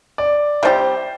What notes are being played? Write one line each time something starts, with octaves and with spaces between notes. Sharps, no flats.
D5
C3 G3 D4 G4 C5